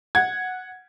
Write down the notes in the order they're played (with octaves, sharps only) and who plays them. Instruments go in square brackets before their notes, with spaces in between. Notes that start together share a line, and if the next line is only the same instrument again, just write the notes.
[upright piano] F#5 G#6